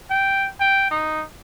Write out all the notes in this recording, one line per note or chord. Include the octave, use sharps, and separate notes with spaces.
G5
G5
D#4